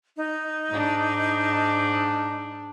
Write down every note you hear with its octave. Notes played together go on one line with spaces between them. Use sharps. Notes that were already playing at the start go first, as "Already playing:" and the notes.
D#4
G#2 D4